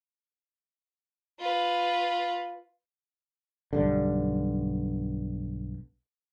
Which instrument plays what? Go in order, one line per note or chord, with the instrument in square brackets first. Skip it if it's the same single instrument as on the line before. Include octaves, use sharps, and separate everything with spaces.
[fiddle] F4 B4
[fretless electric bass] B1 G2 D3